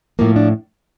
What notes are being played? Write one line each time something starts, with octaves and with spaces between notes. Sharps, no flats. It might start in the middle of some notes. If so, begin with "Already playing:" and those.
A2 F3 A#3
D4